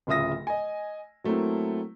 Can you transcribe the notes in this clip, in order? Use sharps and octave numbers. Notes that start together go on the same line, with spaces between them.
D1 C#3 F4 E5 D#6 A#6
D#5 G#5
F#3 A3 A#3 C4 E4